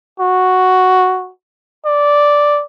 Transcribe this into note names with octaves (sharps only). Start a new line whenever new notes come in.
F#4
D5